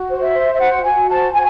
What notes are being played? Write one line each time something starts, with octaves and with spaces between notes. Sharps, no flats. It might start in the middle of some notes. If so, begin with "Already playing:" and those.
Already playing: F#4
C5
E5
C5
E5
F#4 F#5
F#4 G#5
C5 A5
F#4 G#5